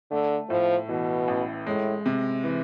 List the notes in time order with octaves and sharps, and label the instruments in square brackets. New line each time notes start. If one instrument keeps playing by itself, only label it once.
[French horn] D3 [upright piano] A3
[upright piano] A2 [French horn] F3
[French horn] B2 [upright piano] E3
[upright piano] A1
[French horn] A2 [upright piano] G#3
[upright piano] C3
E3